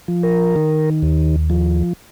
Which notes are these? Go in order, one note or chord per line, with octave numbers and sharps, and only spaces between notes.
F3
A#4
D#3
D#2
F3